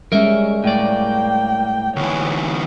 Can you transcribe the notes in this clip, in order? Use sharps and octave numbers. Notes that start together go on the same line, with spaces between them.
G3 G#3 C#4 A#4 E5
A2 A#3 D5 G5
D2 E3 C#5